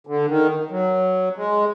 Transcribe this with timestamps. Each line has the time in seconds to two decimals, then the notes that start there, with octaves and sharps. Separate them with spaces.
0.07 D3
0.28 D#3
0.71 F#3
1.36 G#3